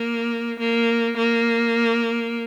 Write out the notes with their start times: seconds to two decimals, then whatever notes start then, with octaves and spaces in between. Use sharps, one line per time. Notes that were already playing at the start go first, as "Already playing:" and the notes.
Already playing: A#3
0.59 A#3
1.17 A#3